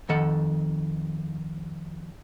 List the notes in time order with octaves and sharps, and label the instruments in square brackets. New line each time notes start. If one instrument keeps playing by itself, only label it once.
[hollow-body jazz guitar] F2 D#3 A4 F#5